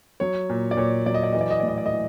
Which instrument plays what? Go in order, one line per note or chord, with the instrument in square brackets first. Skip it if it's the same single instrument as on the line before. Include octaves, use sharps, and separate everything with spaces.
[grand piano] F#3 C#5
A#2
D5
A#2 C#5
F#3 D5
D#5
D5
E3 D#5
D5
D#5
A2 D5
D#5
D5
D#5
E3